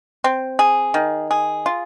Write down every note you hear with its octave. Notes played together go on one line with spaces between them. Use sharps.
C4
G#4
D#3
G#4
F4